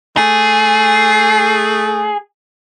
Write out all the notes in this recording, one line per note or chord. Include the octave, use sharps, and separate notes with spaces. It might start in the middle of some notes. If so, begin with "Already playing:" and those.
A3 G#4